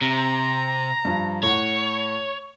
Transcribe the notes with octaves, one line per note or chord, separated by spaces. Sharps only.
C3 A#5
G2 F3
A2 C#5 F#5